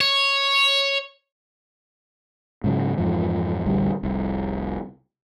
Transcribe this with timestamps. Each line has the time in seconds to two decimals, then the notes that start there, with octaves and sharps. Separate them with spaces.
0.01 C#5
2.64 G#2 C#3 F#3
2.98 F2 G#2 E3 F3
3.66 A1 D2 G3
4.03 F1 C2